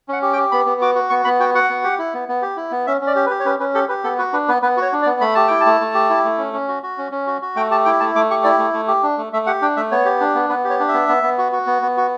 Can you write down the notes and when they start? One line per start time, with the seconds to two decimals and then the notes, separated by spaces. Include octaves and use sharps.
0.08 C#4 F#5
0.22 G4
0.33 G5
0.38 G4
0.52 B3 B5
0.66 B3
0.81 F#4 D6
0.95 F#4
1.10 B3 C#6
1.25 B3 B5
1.40 F#4 G5
1.55 F#4 F#5
1.69 B3
1.84 G4
1.99 E4
2.14 B3
2.29 B3
2.42 G4
2.57 E4
2.71 B3
2.87 C#4 E5
3.01 C#4
3.07 D5
3.15 G4
3.26 B4
3.30 G4
3.40 C#5
3.45 C#4 B4
3.59 C#4 B4
3.74 G4 A4
3.89 G4 B4
4.04 B3 A4
4.18 F#4 B4
4.33 D4 B4
4.48 B3 B4
4.62 B3 B4
4.77 F#4
4.82 C#5
4.92 D4
5.02 D5
5.06 B3
5.21 A3 B5
5.35 G4 A5
5.48 E4 G5
5.61 A5
5.66 A3
5.81 A3
5.94 G4
6.10 E4
6.25 A3
6.38 C#4
6.53 C#4
6.68 F#4
6.83 F#4
6.98 C#4
7.12 C#4
7.27 F#4
7.42 F#4
7.56 A3 G5
7.71 G4 A5
7.85 E4 G5
8.00 A3 A5
8.15 A3 D6
8.30 G4 C#6
8.44 E4 D5
8.59 A3
8.73 A3
8.88 G4
9.03 D4
9.18 A3
9.33 A3 E5
9.47 G4 F#5
9.62 D4 G5
9.77 A3 E5
9.91 B3 C#5
10.05 G4
10.20 D4
10.35 B3
10.49 B3 B4
10.65 G4
10.70 C#5
10.80 D4
10.89 E5
10.94 B3
11.09 B3
11.23 B3
11.38 F#4
11.52 F#4
11.67 B3
11.82 B3
11.97 F#4